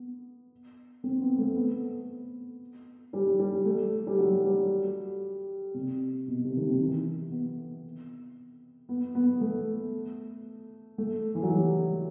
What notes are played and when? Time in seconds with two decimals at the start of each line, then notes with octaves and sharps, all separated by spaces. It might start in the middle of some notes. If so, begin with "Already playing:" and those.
Already playing: B3
1.04 C4
1.21 B3
1.38 A3
1.56 B3
3.13 G3
3.39 G3
3.65 A3
4.07 G3
4.17 F#3
4.44 G3
5.74 C3
6.28 B2
6.44 C3
6.56 D#3
6.62 C3
6.73 F#3
6.79 E3
7.31 B3
8.89 B3
9.15 B3
9.41 A3
10.98 A3
11.35 E3
11.43 F#3
11.51 G3